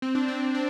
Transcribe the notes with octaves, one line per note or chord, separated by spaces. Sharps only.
C4
D4
C4
D4